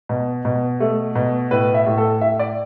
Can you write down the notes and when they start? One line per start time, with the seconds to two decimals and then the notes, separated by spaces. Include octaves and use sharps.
0.09 B2
0.45 B2
0.80 A3
1.16 B2
1.51 A2 B4
1.74 E5
1.86 A2
1.98 A4
2.21 A2 E5
2.39 D5